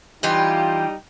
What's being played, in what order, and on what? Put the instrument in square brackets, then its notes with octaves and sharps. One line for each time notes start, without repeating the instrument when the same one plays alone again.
[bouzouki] E3 F4 G4 [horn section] G3 D#4 G5